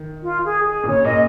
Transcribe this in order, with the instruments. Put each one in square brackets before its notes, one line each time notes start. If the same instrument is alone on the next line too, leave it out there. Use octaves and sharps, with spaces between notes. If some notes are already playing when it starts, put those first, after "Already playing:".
Already playing: [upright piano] D#3
[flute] F4
G#4
G#4
[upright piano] A#2
[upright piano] C#3 [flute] C#5
[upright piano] A#2 [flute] D#5